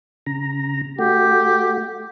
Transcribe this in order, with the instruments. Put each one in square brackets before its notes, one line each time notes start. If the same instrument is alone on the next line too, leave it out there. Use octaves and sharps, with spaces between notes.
[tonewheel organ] C#3 A#5
[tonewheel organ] A3 F#4 [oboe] G4